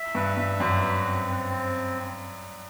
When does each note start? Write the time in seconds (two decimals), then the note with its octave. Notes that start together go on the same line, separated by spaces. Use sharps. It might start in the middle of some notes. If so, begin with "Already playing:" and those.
Already playing: E5
0.15 G2 B4
0.37 G2 E5
0.60 F#2 F#4
0.82 B4
1.04 C4
1.27 C4
1.49 C4